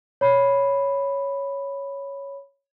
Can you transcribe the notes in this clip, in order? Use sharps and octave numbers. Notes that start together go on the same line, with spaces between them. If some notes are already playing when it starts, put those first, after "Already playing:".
C#5 B5